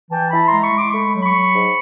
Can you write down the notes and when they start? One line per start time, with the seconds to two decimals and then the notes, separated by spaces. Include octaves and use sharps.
0.10 E3 G5 A5
0.31 E4 A5 B5
0.46 A#5 C6
0.52 G#3
0.62 B5 C#6
0.72 G#3 C6 D6
0.92 A3 B5 C#6
1.13 F#3
1.22 B5 C#6
1.33 F#3
1.53 G#2